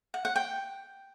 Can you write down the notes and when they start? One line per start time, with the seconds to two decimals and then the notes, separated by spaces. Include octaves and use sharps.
0.14 F#5
0.25 F#5
0.36 G5